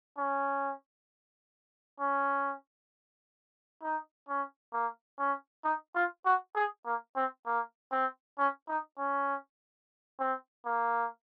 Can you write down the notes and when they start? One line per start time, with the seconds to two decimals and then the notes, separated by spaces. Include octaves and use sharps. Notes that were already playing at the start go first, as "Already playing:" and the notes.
0.18 C#4
2.00 C#4
3.82 D#4
4.28 C#4
4.73 A#3
5.19 C#4
5.64 D#4
5.95 F4
6.25 F#4
6.55 G#4
6.86 A#3
7.16 C4
7.46 A#3
7.92 C4
8.38 C#4
8.68 D#4
8.98 C#4
10.20 C4
10.66 A#3